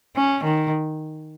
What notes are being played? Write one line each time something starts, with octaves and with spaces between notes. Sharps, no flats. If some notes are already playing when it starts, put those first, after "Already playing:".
C#4
D#3